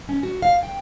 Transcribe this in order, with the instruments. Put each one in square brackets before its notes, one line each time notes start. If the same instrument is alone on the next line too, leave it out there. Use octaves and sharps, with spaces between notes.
[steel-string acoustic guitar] C#4
F#4
F5
G5